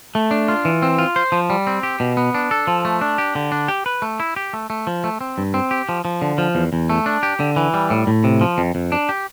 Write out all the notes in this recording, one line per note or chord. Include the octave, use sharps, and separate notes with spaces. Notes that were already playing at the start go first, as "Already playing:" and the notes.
A3
D4
F4
E3
C4
F4
C5
F3
G3
C4
G4
B2
B3
D4
A4
F3
A3
D4
G4
D3
D4
G4
B4
A3
E4
G4
A3
A3
F3
A3
C4
G2
C4
G4
F3
F3
D3
F3
E2
E2
A3
D4
G4
D3
E3
G3
A2
A2
C3
F3
F2
F2
D4
G4